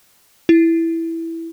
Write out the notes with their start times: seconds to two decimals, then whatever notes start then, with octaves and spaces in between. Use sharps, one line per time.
0.49 E4